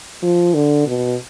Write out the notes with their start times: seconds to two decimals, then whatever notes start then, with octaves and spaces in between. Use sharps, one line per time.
0.23 F3
0.54 D3
0.87 B2